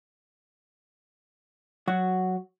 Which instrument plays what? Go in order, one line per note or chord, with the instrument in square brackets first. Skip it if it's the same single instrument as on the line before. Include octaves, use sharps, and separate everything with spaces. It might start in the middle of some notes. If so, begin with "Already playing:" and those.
[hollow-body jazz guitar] F#3 F#4